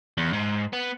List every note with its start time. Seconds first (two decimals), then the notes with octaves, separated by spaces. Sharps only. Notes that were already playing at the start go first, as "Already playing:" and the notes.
0.17 E2
0.33 G#2
0.73 B3